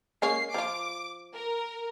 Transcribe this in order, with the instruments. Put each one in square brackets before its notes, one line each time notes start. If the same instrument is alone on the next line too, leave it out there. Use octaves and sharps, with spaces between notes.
[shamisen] G#3 A#3 C#4 [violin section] C7
[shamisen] F3 F4 [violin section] D6
[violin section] A#4